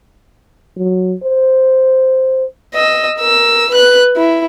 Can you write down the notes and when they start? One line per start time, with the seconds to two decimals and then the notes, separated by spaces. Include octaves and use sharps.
0.77 F#3
1.23 C5
2.74 D#5 E6
3.19 A#4 E6
3.70 B4 F#6
4.17 E4